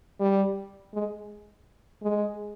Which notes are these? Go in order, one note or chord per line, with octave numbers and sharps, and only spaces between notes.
G3
G#3
G#3